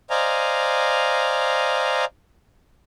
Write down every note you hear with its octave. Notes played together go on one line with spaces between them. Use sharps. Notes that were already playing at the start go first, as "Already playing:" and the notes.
C5 D5 D#5 F5 G#5 A#5